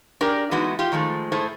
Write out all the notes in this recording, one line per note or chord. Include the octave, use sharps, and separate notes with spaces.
D4 G4 G#4 A#4 D5
E3 G#3 A3 B3 D#4 F#4
F4 G4
D#3 F3 G#3 A3
A2 A3 G#4 C5